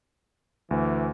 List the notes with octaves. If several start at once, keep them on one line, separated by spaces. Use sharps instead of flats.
D2 E3